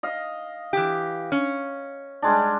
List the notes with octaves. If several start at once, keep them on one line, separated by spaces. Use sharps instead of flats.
D#5 F5
E3 G4
C#4
G3 G#3 D4